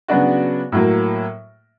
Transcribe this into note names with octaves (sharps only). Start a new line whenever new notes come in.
C#3 F#3 B3 D4 F#4
A2 F#3 A#3